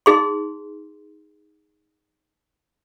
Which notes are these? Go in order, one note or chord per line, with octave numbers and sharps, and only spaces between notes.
D#4 G#4 C6